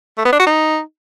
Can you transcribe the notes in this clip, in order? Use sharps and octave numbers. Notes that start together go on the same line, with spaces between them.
A3
B3
D4
F#4
D#4